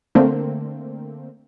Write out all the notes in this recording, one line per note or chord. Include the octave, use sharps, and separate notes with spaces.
D3 A3 A#3 C4